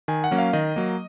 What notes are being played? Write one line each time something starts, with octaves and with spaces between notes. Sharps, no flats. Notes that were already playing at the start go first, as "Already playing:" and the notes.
D#3 G#5
F#5
F#3 A#3 C#4
F5
D#3 D#5
F#3 A#3